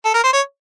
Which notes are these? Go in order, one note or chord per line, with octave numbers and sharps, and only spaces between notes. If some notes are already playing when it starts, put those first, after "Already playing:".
A4
A#4
C5
C#5